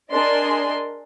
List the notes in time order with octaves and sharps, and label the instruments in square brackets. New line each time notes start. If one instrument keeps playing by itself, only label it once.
[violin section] D4 G#4 A#4 D5 D#5 C6